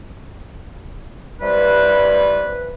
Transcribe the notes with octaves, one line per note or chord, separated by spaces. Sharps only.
C3 E3 G3 B4